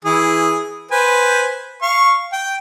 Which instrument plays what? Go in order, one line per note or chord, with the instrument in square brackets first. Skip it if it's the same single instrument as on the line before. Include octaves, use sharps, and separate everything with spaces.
[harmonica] E3 G#4
B4 C5 G#5
F5 C#6
G5